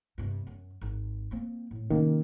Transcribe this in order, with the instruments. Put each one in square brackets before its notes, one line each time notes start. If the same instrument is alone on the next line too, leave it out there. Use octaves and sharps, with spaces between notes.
[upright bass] G2 C3
F#2
G#1
A#3 C4
A2
[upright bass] C3 C#4 [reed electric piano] D#3 A#3